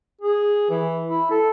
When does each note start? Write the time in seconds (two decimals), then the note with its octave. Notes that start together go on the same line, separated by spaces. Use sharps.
0.21 G#4
0.70 E3
1.08 E4
1.31 A4